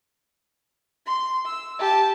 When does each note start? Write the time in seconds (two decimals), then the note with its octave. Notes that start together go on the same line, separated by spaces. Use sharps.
1.06 C6
1.45 E6
1.79 G4 A5